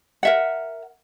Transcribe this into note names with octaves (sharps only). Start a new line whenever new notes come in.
A#4 E5 F#5